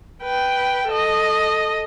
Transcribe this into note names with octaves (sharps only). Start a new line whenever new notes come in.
B4 G5
A4 D#5